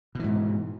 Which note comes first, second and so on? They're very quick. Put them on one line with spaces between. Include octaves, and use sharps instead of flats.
B2 E3 G#2